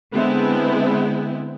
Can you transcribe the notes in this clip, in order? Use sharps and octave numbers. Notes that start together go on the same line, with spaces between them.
D3 G#3 B3 C4 E4